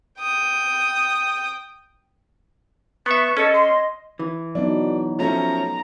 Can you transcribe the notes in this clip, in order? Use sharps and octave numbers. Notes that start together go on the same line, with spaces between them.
G5 D#6
B3 B4 E5 C#6
C#4 A4 D#5
C6
E3
F#3 B3 D4 D#4
F3 A3 C#4 A#5